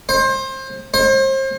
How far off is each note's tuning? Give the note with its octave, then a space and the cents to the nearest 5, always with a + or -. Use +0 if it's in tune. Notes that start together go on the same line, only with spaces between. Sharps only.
C5 +25
C5 +35